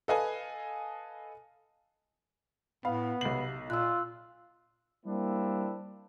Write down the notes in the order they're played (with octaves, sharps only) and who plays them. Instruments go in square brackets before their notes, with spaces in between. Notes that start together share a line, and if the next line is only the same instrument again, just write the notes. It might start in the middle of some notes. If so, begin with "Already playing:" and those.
[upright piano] A4 B4 D#5 F5 G#5
[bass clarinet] A2 [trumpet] B3 [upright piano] F5 [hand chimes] B5
[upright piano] B1 F#7 [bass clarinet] C3 [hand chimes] C7
[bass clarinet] A#2 [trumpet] F4 [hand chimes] E6 F#6
[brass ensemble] G3 A#3 C4 D4 E4